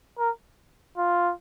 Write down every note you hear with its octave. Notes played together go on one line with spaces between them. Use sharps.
A#4
F4